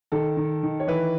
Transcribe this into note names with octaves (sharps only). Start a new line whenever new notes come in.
D#3 A4
D#3
D#3
C#5
E3 B4